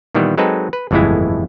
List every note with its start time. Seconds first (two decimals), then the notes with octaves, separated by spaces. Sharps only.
0.15 A#2 D#3 E3 G3 B3
0.38 F#3 G#3 C4 D#4 A4 B4
0.73 B4
0.91 G1 F2 A2 E3 G#3 E4